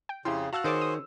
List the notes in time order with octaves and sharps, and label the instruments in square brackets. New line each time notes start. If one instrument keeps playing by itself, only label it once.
[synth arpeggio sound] G5
[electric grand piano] F2 G5 C6 [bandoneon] C#3 [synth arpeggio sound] E4 G4
[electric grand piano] F#4 F5 E6 [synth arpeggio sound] A5 F#6
[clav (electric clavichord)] D#3 [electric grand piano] F#4 G#4 C#5 [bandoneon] C5 [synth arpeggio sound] D6 A6 D7
[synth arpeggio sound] D#6